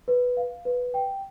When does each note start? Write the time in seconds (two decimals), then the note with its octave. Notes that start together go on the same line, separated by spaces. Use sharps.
0.08 B4
0.37 F5
0.65 B4
0.94 G5